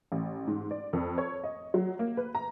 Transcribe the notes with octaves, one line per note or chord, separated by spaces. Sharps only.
A1
G#2
D5
F2
C#5
D#5
F#3
A#3
B4
A#5